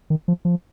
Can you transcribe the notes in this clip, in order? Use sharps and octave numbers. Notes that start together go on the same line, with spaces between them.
D#3
F3
F3